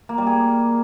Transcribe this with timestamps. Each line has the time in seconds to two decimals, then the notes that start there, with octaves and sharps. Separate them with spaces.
0.09 A#3
0.18 G3
0.27 G#4